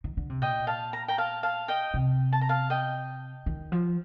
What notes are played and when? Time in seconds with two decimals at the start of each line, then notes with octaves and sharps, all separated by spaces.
0.04 D#3
0.17 D3
0.30 C3
0.42 A#2 D#5 G5
0.67 F5 A5
0.93 A#5
1.08 G5 A#5
1.18 F5 A5
1.43 F5 A5
1.68 D#5 G5
1.94 C3
2.33 A5
2.41 A#5
2.49 F5 A5
2.70 D#5 G5
3.46 D#3
3.72 F3